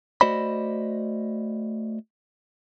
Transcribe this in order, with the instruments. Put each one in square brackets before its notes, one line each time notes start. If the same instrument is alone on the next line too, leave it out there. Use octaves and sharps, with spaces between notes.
[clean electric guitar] A3 F#4 C5 D5 D#5 B5